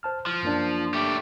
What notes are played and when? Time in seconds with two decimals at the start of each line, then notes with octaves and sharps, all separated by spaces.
0.03 C5 A5 F6
0.26 F3 F6
0.43 F#2 A#3 D4
0.94 A3 G4